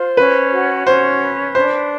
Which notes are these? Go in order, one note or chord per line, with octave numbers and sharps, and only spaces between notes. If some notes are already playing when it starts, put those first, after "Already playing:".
Already playing: F4 C5
C#4 B4
F#4
C#4 C5
B4
D4 C5